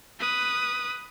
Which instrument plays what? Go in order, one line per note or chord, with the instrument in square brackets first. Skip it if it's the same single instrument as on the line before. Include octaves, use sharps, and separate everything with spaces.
[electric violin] B4 D#6